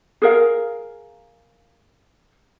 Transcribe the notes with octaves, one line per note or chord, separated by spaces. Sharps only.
G#4 A#4 F5